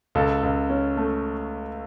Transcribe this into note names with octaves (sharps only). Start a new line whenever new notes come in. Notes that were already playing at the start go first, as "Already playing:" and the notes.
C#2 A4
C#2
C#4
A3